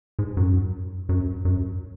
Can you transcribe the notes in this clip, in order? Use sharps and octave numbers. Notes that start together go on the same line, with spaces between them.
G#2
F#2
F#2
F#2